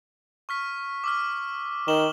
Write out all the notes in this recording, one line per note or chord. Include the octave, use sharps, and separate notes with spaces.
C#6 F6 B6
D6 E6 F6
D#3 E7 F#7 G7